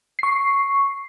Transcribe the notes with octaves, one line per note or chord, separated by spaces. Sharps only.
C#6 C7